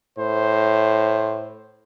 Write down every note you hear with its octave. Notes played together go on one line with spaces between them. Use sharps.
A2 C5